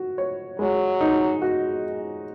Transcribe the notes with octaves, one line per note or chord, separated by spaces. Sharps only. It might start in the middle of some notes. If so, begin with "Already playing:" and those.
Already playing: F#4
C#5
F#3 G#3
D#4
F#4